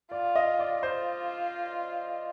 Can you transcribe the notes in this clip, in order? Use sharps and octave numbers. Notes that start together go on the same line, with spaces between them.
F4 D5
D#5
D5
F4 C5